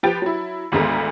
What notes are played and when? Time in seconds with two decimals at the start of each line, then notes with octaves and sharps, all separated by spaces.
0.03 F3 G4 B4 G5 A6
0.22 F#3 E4
0.72 G#1 D2 D3 G#3 B3 A#5